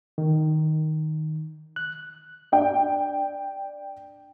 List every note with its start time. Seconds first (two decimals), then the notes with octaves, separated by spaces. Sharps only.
0.18 D#3
1.76 F#6
2.52 D4 G5